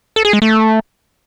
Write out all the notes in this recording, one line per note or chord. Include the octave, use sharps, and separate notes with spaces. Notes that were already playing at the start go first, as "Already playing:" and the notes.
A4
G#4
G#3
A3